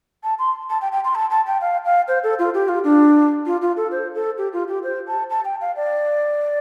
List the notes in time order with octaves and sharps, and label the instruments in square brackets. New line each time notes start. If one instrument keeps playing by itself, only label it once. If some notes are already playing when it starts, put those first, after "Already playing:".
[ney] A5
C6
A5
G5
G5
C6
A5
A5
G5
F5
F5
C5
A4
F4
G4
F4
D4
F4
F4
A4
C5
A4
G4
F4
G4
C5
A5
A5
G5
F5
D5